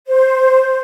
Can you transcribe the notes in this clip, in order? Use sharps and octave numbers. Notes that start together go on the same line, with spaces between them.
C5